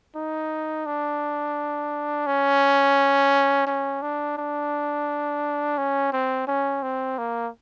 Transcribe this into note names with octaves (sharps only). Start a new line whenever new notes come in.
D#4
D4
C#4
C#4
D4
D4
C#4
C4
C#4
C4
A#3